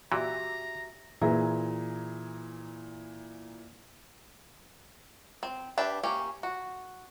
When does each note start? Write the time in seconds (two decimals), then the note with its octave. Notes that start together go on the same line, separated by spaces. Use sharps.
0.12 A#2 E3 F#4 G4 E5 A#5
1.21 A#2 E3 G#4 E5 A#5
5.43 C4
5.78 D4 G4 B4 E5
6.03 A#3 C#4 G4
6.43 F#4